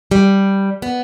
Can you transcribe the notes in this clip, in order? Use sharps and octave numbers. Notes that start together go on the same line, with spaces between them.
G3
B3